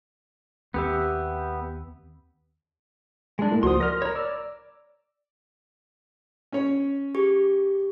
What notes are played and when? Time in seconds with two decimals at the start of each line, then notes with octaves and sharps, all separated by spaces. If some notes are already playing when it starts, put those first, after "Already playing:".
0.74 D#2 B3 C4 G4 E5
3.39 G#3 D4
3.50 A2 A#3
3.63 C#2 F3 F#4 C5 C6 D#6
3.80 A#4 D5 F6 A#6
4.02 A#4 C#5 B5
4.16 D5 E6
6.52 C#4 C#5
7.15 G4 G#4 C#6